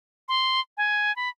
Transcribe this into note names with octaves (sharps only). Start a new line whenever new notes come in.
C6
G#5
B5